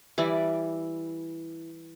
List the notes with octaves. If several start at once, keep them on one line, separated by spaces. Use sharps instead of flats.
E3 G3 E4 D5